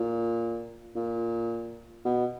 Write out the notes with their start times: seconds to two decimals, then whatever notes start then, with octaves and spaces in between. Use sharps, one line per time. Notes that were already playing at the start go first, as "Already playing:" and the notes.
Already playing: A#2
0.95 A#2
2.05 B2